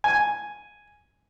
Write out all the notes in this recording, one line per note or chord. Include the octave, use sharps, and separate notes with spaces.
G#5